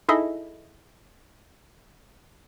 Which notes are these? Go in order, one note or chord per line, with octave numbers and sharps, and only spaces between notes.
D#4 E4 G#4 A4 D#5 E5